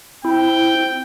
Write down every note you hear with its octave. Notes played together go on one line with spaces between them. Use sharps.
C4 E4 G5